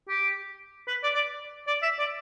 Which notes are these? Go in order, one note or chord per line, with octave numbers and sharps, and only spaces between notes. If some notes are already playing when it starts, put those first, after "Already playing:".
G4
B4
D5
D5
D5
E5
D5